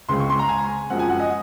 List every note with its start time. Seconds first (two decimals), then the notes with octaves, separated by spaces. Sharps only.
0.09 C#2 C#3 G#3 C4 C6
0.20 C#6
0.30 C6
0.39 A#5
0.49 G#5
0.90 F#2 F3 G#3 C4 F#5
0.99 G#5
1.09 F#5
1.20 D#5